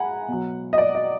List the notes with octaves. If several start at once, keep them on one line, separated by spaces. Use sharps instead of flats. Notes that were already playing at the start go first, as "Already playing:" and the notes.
Already playing: G#3 F#5 G#5 A#5 B5
B2 F#3
D#5
D5
D#5